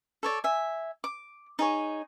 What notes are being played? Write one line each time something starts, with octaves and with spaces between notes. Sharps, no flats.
A4 C#5 D5
E5 G#5
D6
D#4 G#4 C#5